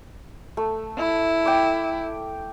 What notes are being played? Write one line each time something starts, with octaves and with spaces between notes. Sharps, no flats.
A3
E4
G5 D6